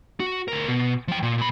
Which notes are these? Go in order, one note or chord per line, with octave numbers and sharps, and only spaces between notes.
F#4
D2 A#4
B2
F3 G5
A#2
A#2 B5